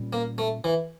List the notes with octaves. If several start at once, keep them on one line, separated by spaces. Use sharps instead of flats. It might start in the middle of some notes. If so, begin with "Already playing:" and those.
Already playing: A#2 G3 C#4
A#3
A3
E3